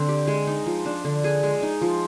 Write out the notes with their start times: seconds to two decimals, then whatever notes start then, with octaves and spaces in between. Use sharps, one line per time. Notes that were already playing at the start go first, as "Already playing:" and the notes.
Already playing: D3 C4
0.08 G4
0.27 G#3
0.47 D#4
0.66 F3
0.86 D4
1.05 D3
1.24 G#4
1.43 G#3
1.62 D#4
1.81 F3